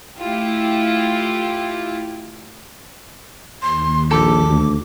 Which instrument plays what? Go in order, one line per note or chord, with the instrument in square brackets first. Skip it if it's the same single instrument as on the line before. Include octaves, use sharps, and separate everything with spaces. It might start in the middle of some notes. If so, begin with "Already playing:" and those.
[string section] A3 E4 F4 G4
[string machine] D#2 [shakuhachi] C6
[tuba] A#1 [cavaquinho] A4 [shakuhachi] D6
[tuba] D2